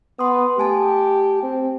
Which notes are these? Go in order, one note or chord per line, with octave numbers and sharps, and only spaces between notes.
B3 C6 D#6
A3 G4 G#5 A5
C4